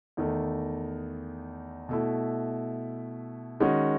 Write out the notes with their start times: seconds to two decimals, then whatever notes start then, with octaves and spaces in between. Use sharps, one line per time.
0.17 E2 D#3 A3
1.89 B2 A3 E4
3.60 D#3 G#3 C#4 F#4